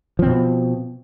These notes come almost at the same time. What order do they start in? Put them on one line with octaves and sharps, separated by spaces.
F3 C4 B2